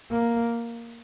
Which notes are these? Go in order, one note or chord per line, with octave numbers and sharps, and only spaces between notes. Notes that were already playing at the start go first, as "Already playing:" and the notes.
A#3